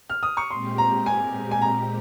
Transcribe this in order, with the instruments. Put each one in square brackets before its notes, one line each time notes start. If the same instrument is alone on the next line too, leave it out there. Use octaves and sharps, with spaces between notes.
[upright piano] F6
D#6
C#6
[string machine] A#2 G#3 C4 G4 [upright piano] C6
[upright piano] A#5
G#5
G#5
A#5